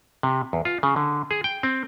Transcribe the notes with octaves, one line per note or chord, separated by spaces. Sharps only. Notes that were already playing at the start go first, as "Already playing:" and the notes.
C3
E2
F4
C#3
D3
G#4
G5
C4